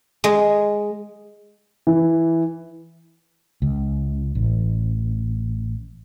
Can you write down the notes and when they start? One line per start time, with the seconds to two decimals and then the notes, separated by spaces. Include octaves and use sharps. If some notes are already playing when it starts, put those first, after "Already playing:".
0.24 G#3
1.87 E3
3.62 C#2
4.35 A1